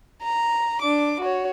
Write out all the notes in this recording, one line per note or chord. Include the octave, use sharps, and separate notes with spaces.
A#5
D4 D6
F#4 C#5